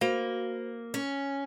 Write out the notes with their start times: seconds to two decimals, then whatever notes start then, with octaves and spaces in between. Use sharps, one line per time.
0.01 A#3 F#4 C5 F5
0.94 C#4